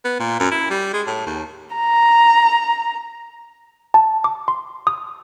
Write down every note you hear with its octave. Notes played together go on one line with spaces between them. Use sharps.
B3
A#2
F#2
E4
G3
G#3
A2
D#2
A#5
A5
D6
C6
D#6